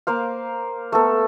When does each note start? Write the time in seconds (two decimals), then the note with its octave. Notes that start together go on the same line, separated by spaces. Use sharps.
0.07 A#3 C5 F5
0.92 A3 B3 A4